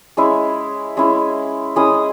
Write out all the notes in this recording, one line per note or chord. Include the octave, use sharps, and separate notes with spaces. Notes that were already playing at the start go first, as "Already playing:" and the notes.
G#3 C#4 E4
G#3 C#4 E4
G#3 C#4 E4 D#6